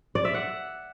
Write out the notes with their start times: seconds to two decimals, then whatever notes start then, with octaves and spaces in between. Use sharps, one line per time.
0.15 D5
0.25 E5
0.34 F#5